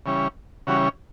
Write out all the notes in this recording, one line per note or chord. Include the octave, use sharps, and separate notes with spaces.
C#3 E3 G3 C#4
C#3 E3 G3 C#4 F#4